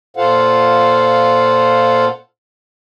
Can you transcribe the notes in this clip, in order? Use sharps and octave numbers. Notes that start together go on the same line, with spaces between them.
A#2 F4 A4 C5 F5 F#5